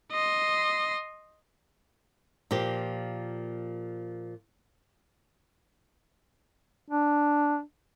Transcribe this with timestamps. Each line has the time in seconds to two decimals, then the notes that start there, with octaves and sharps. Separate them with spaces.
0.12 D#5 C6
2.51 A#2 F3 A#3 G4
6.90 D4